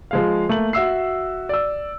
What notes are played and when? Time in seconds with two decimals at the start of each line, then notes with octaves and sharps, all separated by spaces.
0.11 F3 G#3 F5
0.49 A3 A#3 F#7
0.73 F#4 E5 E6 C7
1.49 D5 E6